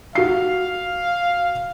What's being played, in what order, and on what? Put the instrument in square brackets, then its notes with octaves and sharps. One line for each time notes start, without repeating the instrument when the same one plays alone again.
[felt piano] F#4 C7 [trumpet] F5